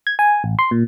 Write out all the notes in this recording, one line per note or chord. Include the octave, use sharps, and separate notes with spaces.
G#6
G#5
A1
C6
A#2